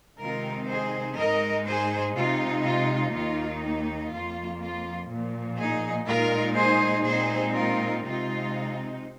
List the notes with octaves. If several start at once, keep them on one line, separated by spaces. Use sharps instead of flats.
C3 D#3 G#3 C4 D#4 F4 A#4
G#4 C5
G#2 G#3 D#4 A#4 D#5
G#4 C5
C3 G#3 D#4 F4
F4
D#2 D#3 A#3 D#4 F4
F2 F3 A#3 F4
F4
A#2 F3 A#3
D#4 G#4
A#2 G#3 D#4 F4 A#4
G#4 C5
A#2 G#3 C4 D#4 G#4 C5
F4 A#4
C3 G#3 C4 D#4 F4